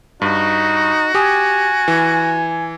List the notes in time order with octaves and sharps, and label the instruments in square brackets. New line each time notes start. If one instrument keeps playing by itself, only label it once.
[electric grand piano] G2 [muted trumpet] D#4 [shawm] F#4
[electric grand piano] G4 D#6 [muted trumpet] G#5
[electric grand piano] E3